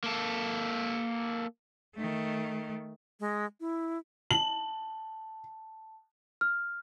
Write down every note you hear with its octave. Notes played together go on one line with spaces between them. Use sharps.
A#3 A4
D#3 A3
G#3
E4
A5 F#7
F6